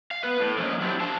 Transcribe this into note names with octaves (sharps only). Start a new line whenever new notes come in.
F5
B3 B4
A2
D3 F3 A#3 C#4 D#4
F#3 C4 D4 E4 G4
F3 D4 F5 A5